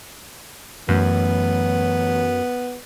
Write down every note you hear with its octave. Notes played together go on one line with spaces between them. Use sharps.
F#2 E3 A3 B3